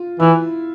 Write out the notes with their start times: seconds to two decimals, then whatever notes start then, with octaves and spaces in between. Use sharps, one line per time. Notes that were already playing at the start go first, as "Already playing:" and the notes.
Already playing: F4
0.20 E3 E4